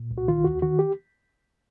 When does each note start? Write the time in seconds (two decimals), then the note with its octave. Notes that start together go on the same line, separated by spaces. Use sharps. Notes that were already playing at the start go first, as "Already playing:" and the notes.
Already playing: A#2
0.11 C2
0.18 F#4
0.28 D#3 F4
0.44 D#2 F#4
0.62 D#3 F#4
0.79 G4